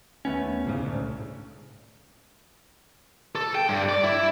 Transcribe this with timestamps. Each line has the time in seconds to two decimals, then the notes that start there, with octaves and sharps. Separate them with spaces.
0.25 D#2 A3 B3 C#4
0.65 C2 G#2 C#3
0.84 D2 A2
3.35 A4
3.55 G5
3.69 G2
3.89 D5
4.04 E4